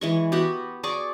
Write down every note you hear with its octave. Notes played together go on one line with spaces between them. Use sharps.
E3 G#3 C#6
B3 F#4 G4
G#4 D5 C#6 D6